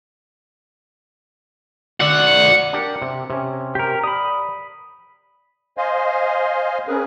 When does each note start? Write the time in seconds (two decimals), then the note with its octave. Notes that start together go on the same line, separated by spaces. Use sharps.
2.01 F#4 D5 F#5
2.73 D4 G4 A#4
3.02 C3
3.30 C3 C#4
3.75 G4 A#4
4.04 D5 B5 D#6
5.78 C5 D#5 F5 G#5 C6
6.87 C4 C#4 G#4 A#4 B4